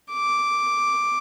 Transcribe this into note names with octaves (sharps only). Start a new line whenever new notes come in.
D6